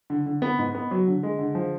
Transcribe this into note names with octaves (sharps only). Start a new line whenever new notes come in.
D3
D3
B3
G#2
B3
F#3
D3
G#3
D3
F3